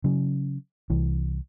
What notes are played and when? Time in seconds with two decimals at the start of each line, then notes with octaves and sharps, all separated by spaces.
0.04 C#3 F#3
0.90 C2 E3